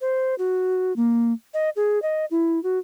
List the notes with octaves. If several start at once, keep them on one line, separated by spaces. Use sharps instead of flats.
C5
F#4
A#3
D#5
G#4
D#5
E4
F#4